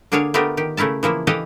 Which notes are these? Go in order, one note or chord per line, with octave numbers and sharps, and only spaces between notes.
D3 A#3 D4 G#4 C#5 F5
A3 B3 D4 F4 G4 A#4
D#3 G4
C#3 A3 E4 A#4 A5
E3 F3 A#3 E4
E3 G4 A4 B4 D#5 F5